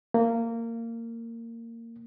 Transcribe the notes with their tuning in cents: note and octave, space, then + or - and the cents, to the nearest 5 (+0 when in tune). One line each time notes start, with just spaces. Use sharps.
A#3 -20